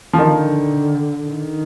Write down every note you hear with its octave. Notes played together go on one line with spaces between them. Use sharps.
F3
D3 D#3
D#3